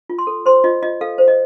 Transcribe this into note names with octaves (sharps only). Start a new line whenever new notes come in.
F4
C6
A4
C5 C6
F4 D#5
F4 D#5
A4 F5
C5
D#5